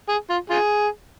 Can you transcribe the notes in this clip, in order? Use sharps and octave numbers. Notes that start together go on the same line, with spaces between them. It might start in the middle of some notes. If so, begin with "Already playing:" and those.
G#4
F4
F4 G#4